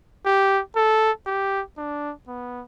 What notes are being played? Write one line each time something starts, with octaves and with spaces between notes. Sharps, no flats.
G4
A4
G4
D4
B3